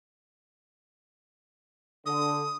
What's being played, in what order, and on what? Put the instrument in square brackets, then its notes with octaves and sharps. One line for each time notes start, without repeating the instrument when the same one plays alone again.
[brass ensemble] D3 [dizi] D#6